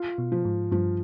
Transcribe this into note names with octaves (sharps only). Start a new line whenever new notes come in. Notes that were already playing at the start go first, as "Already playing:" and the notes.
Already playing: F4
B2
F3
G#2
G2 F3